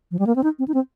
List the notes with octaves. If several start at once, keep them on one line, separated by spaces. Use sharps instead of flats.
F3
G3
A#3
C4
D#4
C4
D#4
C4